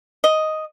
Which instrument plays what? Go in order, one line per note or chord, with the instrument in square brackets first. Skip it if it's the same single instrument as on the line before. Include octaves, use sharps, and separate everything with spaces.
[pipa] D#5